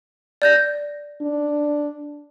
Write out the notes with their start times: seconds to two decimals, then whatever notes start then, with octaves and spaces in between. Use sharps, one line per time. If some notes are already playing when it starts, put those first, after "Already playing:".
0.42 D5 G6 A#6
1.22 D4